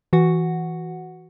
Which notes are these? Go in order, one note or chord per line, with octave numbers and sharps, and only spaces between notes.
E3 F#4 F#5